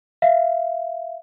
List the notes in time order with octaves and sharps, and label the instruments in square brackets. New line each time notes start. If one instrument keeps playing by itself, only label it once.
[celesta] E5 F5